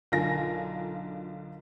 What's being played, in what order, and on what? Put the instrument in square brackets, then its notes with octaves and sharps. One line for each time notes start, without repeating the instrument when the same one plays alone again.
[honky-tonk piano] B1 D3 F4 A#4 G#5 A#6